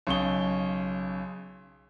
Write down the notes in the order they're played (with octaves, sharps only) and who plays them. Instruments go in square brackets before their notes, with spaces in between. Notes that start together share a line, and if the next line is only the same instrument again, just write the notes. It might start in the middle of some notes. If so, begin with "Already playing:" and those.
[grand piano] B1 C#3 C#6 G7